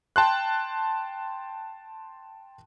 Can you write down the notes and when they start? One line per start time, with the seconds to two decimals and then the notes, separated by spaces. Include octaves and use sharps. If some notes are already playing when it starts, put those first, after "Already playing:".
0.16 G5 A5 C6 F#6